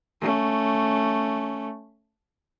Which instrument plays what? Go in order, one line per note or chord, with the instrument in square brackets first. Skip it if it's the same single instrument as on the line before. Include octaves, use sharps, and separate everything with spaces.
[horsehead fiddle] A3 C#4